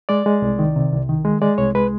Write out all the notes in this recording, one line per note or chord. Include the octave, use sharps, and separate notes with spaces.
G#3 D5
G#3
C2
D#3
C3
C2
D#3
G#3
G#3 D5
C2 C#5
G#3 B4